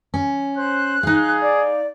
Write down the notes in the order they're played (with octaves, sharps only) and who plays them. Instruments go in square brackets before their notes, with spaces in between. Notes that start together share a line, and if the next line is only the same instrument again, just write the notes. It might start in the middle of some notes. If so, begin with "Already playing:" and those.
[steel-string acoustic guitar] C#4
[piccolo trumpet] C5 [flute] F#6
[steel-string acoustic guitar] D#4 F5 [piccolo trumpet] G#4
[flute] D5